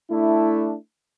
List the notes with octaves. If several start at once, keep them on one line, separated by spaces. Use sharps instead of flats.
A3 D4 E4